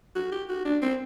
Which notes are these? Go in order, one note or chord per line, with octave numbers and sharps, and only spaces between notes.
F#4
G4
F#4
D4
C4